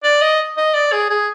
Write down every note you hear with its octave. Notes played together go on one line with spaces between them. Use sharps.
D5
D#5
D#5
D5
G#4
G#4